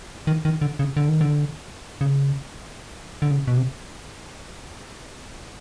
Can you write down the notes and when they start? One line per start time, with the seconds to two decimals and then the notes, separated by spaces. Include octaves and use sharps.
0.27 D#3
0.45 D#3
0.61 D3
0.79 C#3
0.97 D3
1.09 D#3
1.21 D3
2.01 C#3
3.22 D3
3.31 C#3
3.47 B2
3.57 C3